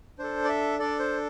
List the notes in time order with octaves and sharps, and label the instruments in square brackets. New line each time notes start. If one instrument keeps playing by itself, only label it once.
[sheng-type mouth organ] D4 A4 C5
D5
E5
D4 A4 D5
C5